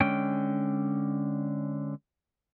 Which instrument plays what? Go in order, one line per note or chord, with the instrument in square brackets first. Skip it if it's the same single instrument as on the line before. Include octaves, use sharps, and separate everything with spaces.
[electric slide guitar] D3 G#3 C#4 G5